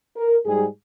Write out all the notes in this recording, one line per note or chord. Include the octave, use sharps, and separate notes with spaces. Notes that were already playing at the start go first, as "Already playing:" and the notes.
A#4
G#2 G3 G#4